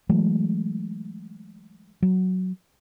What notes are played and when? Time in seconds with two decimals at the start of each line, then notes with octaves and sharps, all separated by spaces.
0.09 E3 F#3 G#3 A3
2.02 F#3